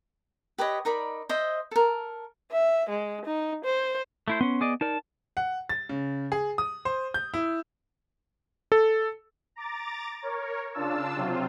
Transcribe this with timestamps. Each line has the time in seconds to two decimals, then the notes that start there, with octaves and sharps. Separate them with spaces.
0.58 G4 B4 C#5 D#5
0.85 D#4 A#4 D5 B5
1.29 C5 D#5 E5
1.71 A4 A#4
2.52 E5
2.89 G#3
3.26 D#4
3.65 C5
4.28 A3 E4 C5
4.41 B3 C#4 C6
4.61 G#4 D5 D#5
4.81 D#4 A#4 D5 A5
5.37 F#5
5.69 A6
5.89 C#3
6.32 G#4
6.58 D#6
6.85 C5
7.14 G6
7.34 E4
8.72 A4
9.56 A#5 D6 A6
10.22 A#4 C#5
10.74 C#3 D4 F4 A5 E6
11.16 C3 F#3 C4 F4